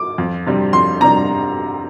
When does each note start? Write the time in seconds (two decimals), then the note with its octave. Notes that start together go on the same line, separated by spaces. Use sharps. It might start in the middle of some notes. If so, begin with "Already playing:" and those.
Already playing: D6
0.18 F2
0.46 C3 G3 D4
0.73 F2 C6
1.01 C3 G3 D4 A#5